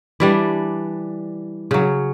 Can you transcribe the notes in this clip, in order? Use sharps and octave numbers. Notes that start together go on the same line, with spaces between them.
E3 G3 D4
C#3 F#3